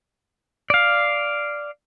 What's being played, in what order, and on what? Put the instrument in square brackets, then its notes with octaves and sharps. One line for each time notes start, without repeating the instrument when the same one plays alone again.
[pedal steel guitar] D5 F5